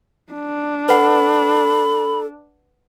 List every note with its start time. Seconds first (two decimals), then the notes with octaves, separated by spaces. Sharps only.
0.33 D4
0.89 A4 B4 F#5 B5